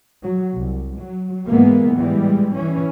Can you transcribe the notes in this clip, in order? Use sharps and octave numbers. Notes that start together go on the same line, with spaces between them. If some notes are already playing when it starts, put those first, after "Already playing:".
F#3
C2
F#3
G#2 E3 G#3 A#3 B3
A2 E3 G3 G#3
E3 C#4